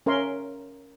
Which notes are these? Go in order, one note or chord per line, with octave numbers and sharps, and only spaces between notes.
C#4 A#4 C#5 E5 C6